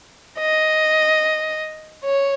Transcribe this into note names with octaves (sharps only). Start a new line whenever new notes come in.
D#5
C#5